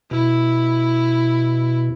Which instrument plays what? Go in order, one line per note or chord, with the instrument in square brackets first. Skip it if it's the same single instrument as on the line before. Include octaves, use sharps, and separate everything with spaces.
[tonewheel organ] B2 [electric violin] E4